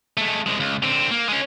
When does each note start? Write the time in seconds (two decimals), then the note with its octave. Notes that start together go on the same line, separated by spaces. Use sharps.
0.17 G#3 A3
0.46 C2 G#3
0.60 C#2
0.83 D3 C4
1.11 A#3
1.29 G#3 C#4